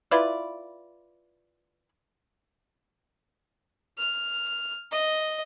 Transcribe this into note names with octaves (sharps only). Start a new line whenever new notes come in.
E4 F4 B4 D5
F6
D#5